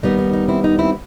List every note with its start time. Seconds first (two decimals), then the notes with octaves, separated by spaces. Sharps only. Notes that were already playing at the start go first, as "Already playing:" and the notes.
0.02 D#2 D#3 G3 B3 D#4
0.18 D#4
0.33 D#4
0.48 C4 E4
0.64 D#4
0.79 C4 E4